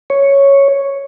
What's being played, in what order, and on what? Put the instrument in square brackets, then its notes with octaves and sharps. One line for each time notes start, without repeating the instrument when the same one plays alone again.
[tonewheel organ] C#5